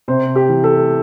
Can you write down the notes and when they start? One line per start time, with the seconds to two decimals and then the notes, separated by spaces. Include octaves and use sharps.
0.08 C3 C5
0.36 G4
0.49 E3
0.64 A4